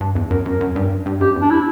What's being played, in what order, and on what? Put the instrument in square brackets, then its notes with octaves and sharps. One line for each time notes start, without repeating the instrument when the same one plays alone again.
[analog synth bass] G2 [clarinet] D4
[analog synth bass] E2
[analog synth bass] F#2 [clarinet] A#4
[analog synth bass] F#2 [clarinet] A#4
[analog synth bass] F#2
G2
G2
[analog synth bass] F#2 [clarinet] G4
[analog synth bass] E2
[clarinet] D4
E4